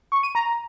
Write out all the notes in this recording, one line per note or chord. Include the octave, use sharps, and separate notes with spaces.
C#6
D#7
A#5